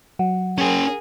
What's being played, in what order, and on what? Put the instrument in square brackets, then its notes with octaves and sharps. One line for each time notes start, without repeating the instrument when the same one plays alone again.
[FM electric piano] F#3 [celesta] F#5
[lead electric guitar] C#4 G5 [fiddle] G#4 A#4